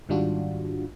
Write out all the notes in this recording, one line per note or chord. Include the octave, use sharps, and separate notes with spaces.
G#2 D#3 G3 D4 F4 F#4